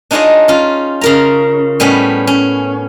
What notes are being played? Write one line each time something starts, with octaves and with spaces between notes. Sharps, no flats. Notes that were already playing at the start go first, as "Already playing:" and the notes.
D4 D#4 F4 G#4 C#5 D#5
C#4 F4
C#3 A#4 A#5
A2 G3 B3 C#4
C#4